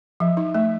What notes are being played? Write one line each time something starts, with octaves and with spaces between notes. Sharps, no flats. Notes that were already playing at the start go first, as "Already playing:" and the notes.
F3 E5
D#4
A3 E5